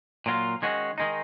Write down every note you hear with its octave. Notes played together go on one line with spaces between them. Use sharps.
A#2 F#3 A#3 F4
D#3 G#3 C#4 F#4
D#3 G#3 D#4